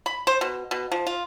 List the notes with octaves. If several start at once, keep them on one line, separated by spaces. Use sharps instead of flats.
B5
C5
B2
B2
F3
F4